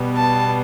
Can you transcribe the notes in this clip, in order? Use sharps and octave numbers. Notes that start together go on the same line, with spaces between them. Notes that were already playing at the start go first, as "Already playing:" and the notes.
Already playing: B2 G3 B3
A5